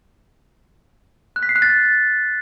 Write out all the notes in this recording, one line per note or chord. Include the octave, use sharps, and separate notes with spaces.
F#6
B6
C7
F#6
A6